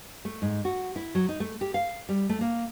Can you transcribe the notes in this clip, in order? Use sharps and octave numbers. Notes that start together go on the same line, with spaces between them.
A3
G#2
F#4
E4
F#3
D#4
A3
G4
F5
G3
A3
A#3